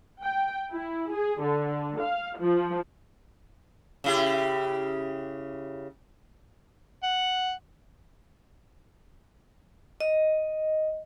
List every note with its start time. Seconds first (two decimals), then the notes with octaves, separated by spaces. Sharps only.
0.23 G5
0.73 E4
1.13 G#4
1.43 D3
2.01 F5
2.40 F3
4.04 C#3 E4 G4
7.04 F#5
10.00 D#5